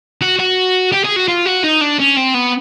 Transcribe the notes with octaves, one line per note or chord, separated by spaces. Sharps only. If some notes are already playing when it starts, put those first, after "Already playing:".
F#4
F#4
G4
G#4
F#4
F4
F#4
D#4
D4
C#4
C4
B3